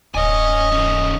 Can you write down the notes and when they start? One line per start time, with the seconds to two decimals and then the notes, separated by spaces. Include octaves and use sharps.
0.15 D1 F#2 C#5 D#5 G#5
0.72 D#3 C#4